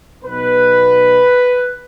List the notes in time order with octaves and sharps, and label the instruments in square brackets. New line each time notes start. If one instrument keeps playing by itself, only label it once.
[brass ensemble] B1 B2 B3 D#4 B4